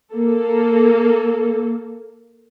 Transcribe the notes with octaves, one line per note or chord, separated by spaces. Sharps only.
A#3 A4